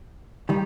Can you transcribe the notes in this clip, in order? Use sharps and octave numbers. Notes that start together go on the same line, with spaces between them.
D#3 G3